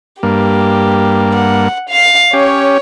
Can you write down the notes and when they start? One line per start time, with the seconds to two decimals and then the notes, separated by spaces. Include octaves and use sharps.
0.23 G2 A#3 G4
1.35 F#5
1.90 F5
2.33 C#4 G4 C#5